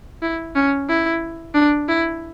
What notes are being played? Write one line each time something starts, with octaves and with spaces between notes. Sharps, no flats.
E4
C#4
E4
D4
E4